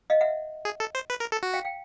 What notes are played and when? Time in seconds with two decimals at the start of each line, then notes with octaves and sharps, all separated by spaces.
0.10 D#5 F5
0.21 E5 F#5
0.65 G#4
0.80 A4
0.95 C5
1.10 B4
1.20 A#4
1.32 A4
1.43 F#4
1.53 F5 G5
1.65 F5 G5